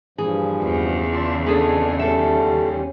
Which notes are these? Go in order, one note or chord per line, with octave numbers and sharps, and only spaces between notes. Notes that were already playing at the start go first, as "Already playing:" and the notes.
G2 A#2 E3 F3 G#4
E2 C#3
F4 D5 A5
F2 B3 D4 G#4 A4 G#5
D#2 G3 C#4 A4 E5